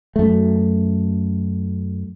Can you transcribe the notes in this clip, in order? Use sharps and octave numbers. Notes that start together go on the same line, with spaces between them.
F#2 A3